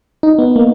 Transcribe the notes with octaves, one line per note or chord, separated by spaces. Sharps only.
D#4
B3
A#3